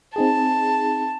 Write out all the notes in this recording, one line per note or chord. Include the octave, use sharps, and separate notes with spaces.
C4 D#4 G#4 A5